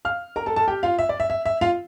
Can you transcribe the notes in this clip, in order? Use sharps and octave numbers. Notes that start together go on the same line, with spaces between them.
F5 F6
A#4 A#5
A4 A5
A4 A5
G4 G5
F4 F5
E5
D5
E5
E5
E5
F4 F5